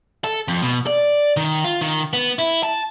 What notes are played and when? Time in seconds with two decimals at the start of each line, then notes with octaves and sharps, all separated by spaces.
0.24 A4
0.48 F2
0.62 B2
0.87 D5
1.37 D#3
1.64 F4
1.81 D#3
2.13 B3
2.39 E4
2.63 A5